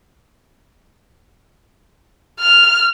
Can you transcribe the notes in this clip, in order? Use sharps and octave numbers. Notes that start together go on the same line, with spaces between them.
F6